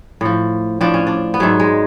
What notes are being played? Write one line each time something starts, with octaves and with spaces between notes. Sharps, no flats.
A2 F3
A2 F3 D4
C#4
D4
B3
G#2 F#3 A3
G#3